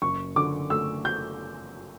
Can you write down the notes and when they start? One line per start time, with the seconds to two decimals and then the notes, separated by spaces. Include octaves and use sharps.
0.02 F#1 C#6
0.36 D3 D6
0.70 A3 E6
1.05 G6